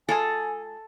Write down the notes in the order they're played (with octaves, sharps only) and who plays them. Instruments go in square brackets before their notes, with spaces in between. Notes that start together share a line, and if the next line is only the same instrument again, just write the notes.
[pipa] G#3 F4 G#4 [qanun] A4 [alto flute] G#5